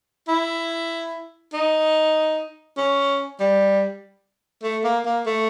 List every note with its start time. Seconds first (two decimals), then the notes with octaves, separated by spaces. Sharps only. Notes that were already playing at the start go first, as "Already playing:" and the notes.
0.28 E4
1.53 D#4
2.77 C#4
3.40 G3
4.63 A3
4.84 A#3
5.05 A#3
5.26 A3